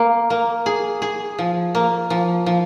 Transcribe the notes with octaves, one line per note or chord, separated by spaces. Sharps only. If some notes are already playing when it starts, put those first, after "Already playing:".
Already playing: A#3
A#3
G#4
G#4
F3
A#3
F3
F3